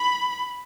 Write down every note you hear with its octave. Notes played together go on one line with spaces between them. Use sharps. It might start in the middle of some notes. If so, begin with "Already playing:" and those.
Already playing: B5